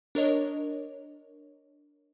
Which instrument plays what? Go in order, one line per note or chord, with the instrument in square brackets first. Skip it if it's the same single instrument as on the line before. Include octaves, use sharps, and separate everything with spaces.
[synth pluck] D4 A#4 C#5 D#5